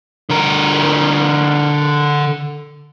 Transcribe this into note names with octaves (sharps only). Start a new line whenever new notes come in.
D3 A#4